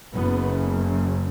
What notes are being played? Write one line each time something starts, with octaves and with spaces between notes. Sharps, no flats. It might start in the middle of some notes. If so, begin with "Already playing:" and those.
F#1 F#2 C#3 B3